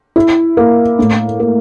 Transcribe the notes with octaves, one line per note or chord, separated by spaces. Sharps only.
E4
A#3
A2
A#3